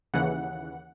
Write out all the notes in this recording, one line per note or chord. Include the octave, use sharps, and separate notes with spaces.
D#2 C#3 E3 F#5